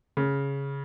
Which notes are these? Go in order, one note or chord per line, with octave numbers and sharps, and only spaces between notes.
C#3